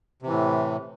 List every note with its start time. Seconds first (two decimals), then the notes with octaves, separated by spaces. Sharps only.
0.22 C3
0.26 E3
0.30 A2